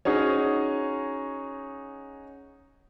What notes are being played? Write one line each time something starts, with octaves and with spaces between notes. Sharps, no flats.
C#4 D#4 F#4 G#4 D#5